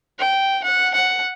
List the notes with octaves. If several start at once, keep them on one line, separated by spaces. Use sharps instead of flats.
G5
F#5
F#5